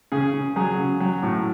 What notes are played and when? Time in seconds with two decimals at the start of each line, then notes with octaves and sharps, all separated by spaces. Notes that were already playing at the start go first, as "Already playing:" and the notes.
0.12 C#3 G#4
0.34 C#3
0.56 F#3 G#4
0.78 C#3
1.00 F#3
1.23 A2